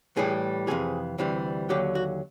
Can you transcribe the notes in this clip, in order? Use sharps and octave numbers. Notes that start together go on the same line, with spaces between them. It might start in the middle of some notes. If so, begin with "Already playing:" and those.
A2 E3 G3 G#4
F2 C3 E3 G#4
D2 C3 E3 G3
D#2 D3 F#3 G4
F#4